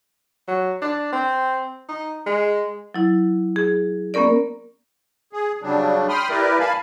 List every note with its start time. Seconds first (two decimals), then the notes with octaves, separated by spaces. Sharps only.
0.48 F#3
0.82 D4
1.12 C4
1.89 D#4
2.26 G#3
2.94 F#3 E4
3.56 G#4
4.14 A#3 B3 C#4 A#4 D5
5.33 G#4
5.62 C#3 F#3 G3 D4
6.09 G5 B5 C6 D#6 F6
6.29 E4 G4 A#4 B4 D5
6.60 F5 G#5 A5 B5